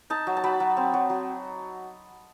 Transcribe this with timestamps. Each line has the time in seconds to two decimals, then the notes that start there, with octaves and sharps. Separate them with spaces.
0.10 D#4 A5
0.27 F#3
0.37 A5
0.44 F#3 B5
0.60 F#3
0.77 C4
0.94 F#3
1.10 F#3